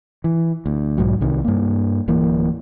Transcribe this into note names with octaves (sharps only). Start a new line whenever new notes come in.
E3
D2
B1 G#2 F#3
C2 C3 D#3
G2 A#3
D1 E3 A#3